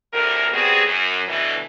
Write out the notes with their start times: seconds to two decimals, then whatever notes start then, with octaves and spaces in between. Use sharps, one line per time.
0.13 D2 A2 C3 A#4
0.53 G3 B3 C4 F#4 G#4
0.86 F#2
1.28 D2 B2 E3